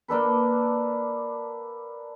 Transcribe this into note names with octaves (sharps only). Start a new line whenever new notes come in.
A#3 D4 A4 B4